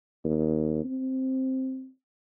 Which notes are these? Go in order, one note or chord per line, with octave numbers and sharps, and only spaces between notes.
D#2
C4